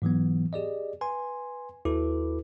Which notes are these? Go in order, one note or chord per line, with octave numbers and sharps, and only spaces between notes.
G#2 E3 F#3 B3
G4 G#4 D5 D#5
B4 G#5 C6
D#2 E4 F#4 A4 B4 D6